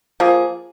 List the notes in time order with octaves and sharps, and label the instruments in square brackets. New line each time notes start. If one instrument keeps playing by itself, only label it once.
[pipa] F3 A#3 G#4